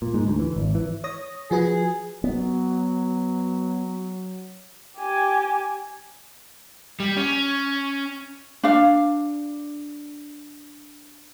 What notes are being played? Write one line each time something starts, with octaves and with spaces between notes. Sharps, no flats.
A#2
G#2
D2
E3
G#1
E3
C#5 D#6 A#6
F3 F#4 G#4 B4
F#3 B3
G4 G#5
G3
C#4
D4 F5